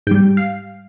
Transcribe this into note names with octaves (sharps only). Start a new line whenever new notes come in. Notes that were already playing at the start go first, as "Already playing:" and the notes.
G#2 G3 G5
F5